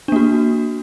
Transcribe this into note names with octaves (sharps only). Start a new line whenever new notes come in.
A#3 D4 F#4